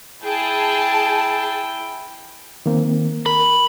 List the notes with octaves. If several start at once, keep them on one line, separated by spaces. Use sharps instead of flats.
E4 G#4 G5 A5
D#3 A#3 C4
A#4 B5